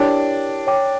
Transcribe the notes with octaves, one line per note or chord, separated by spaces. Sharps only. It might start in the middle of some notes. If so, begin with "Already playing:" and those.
Already playing: D4 E4 G4 A#4 C#5 G5
C#5 G5 D6